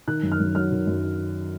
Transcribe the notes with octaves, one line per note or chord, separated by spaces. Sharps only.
D#3 F#6
F#2
F6
F#2
F#3 F6
D#3
F#2